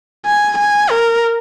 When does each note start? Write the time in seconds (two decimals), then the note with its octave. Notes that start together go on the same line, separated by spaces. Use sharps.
0.26 G#5
0.58 G#5
0.91 A#4